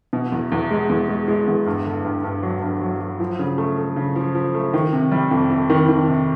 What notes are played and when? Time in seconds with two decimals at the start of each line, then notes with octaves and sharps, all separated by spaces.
0.13 B2
0.32 E2
0.52 E2
0.71 G#3
0.90 E2
1.09 G#3
1.28 G#3
1.48 E2
1.66 G2
1.85 D3
2.05 G2
2.24 G2
2.43 F#3
2.63 G2
2.81 F#3
3.01 F#3
3.20 F3
3.39 C#3
3.58 A3
3.78 A3
3.96 C#3
4.16 F3
4.35 F3
4.55 A3
4.74 D#3
4.93 C3
5.12 G3
5.31 F2
5.50 F2
5.70 D#3
5.88 D#3
6.08 C3